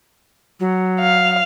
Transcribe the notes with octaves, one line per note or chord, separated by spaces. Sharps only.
F#3
F5